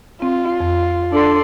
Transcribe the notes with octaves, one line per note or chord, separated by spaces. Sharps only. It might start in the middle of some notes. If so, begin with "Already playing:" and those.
C4 F4
F2
D4 A4 D5 C6